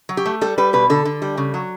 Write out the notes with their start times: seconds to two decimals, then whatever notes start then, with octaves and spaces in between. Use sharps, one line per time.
0.09 F#3
0.17 G4
0.26 A3
0.41 G3 A4
0.58 G3 B4
0.73 B2 B4
0.90 D3 A4
1.05 D3
1.22 G3
1.37 C#3
1.54 F#3